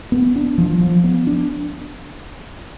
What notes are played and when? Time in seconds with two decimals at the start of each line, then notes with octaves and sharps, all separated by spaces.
0.12 B3
0.36 D4
0.58 F3
0.81 F3
1.04 B3
1.27 D4